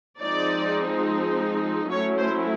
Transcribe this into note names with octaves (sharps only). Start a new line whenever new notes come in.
F3 G#3 C4 D#4 D5
F#3 A3 C#4 E4 C#5
C5